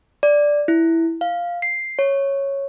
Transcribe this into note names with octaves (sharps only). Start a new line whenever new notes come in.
D5
E4
F5
C7
C#5